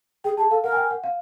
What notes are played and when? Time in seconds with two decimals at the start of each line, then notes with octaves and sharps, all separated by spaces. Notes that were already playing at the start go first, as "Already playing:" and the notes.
0.24 G#4 G5
0.37 G#4 A5
0.50 A4 F5
0.63 A#4 F#5
0.72 G#5
0.76 G5
0.91 F#5
1.04 F5